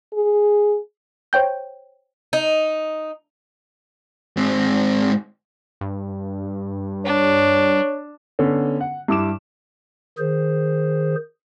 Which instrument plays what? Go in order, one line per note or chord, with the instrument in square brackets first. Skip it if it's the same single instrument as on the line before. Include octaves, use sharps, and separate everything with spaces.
[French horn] G#4
[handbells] C5 C#5 G5 G6
[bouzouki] D#4
[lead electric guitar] G#2 C4
[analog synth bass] G2
[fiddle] D4 [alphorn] C#5
[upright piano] D3 B3 C#4
F#5
G2 E4 D6 E7
[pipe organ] D#3 G#4 C5